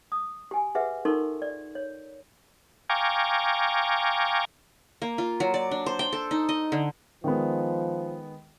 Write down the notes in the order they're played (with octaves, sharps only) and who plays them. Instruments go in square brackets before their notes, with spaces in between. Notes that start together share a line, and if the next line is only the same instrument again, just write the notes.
[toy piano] D#6
G4 G#5
G4 G#4 B4 E5 F#5
D#4 F4 A4 A#4 C6 C#6
D5
C#5
[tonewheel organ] F5 G5 G#5 A#5 C#6 D6
[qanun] A#3
F4
F#3
D5
D4
C5
G5
A4
D#4
D#5
D3
[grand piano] D#3 G#3 B3 [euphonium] F3